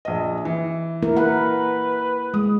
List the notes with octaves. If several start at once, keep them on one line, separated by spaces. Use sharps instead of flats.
A#1 D#5
E3
A#3 E4 A#4
A#3 A#4 B4 F#5
G#3 D#6